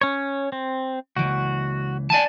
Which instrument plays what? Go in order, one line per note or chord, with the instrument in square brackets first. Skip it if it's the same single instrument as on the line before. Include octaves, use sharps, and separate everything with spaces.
[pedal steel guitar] C#4 C#5
C4
[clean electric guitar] C#2 E3 [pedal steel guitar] F#4
[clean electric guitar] D5 G#5 A5